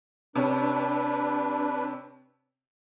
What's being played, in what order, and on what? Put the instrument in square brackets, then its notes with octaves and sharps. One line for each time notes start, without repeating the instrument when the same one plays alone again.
[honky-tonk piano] C3 C#4 [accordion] D4 B4